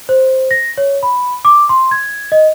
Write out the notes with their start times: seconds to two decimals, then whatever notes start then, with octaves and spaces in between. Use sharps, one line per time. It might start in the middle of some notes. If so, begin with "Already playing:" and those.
0.09 C5
0.51 A#6
0.78 C#5
1.03 B5
1.45 D6
1.69 C6
1.91 G#6
2.32 D#5